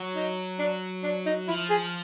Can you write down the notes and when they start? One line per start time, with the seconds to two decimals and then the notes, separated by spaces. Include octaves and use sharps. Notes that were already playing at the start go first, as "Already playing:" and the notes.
Already playing: F#3
0.15 D#4
0.59 D4
1.03 D4
1.26 D#4
1.48 F3 E4
1.70 G#4